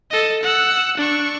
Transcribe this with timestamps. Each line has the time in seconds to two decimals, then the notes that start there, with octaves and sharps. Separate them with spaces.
0.11 A4 D#5
0.43 F#5 E6
0.97 D4 C#6